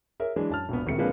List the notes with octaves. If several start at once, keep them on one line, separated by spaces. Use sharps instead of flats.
G#4 A#4 C#5 E5
E3 F#3 G#3 D4
F#2 A5 F6
E1 A#1 B3
D#1 D2 C3 D#3 G#3 C#7
C3 F3 G#3 A#3 D4 B4